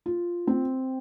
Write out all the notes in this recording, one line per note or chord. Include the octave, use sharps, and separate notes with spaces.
F4
C4